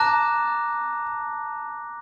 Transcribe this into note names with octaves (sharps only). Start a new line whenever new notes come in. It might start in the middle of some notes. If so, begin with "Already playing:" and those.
Already playing: A5 A#5 D6 F#6 A#6